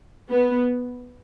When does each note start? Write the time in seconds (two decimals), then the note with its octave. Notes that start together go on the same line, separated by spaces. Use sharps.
0.30 B3